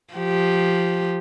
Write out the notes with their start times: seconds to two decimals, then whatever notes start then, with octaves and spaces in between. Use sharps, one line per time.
0.14 F3 G4